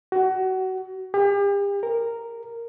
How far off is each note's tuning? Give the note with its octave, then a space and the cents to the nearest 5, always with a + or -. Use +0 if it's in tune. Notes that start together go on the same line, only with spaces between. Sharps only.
F#4 +25
G4 +40
A#4 -5